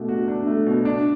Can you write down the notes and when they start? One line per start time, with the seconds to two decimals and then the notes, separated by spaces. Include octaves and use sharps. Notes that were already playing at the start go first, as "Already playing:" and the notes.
Already playing: B2 A3 D4
0.09 F#4
0.28 D4
0.47 A3
0.66 B2
0.85 D4